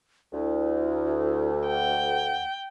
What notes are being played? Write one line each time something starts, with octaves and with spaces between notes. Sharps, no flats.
D2 E4
F#5 G5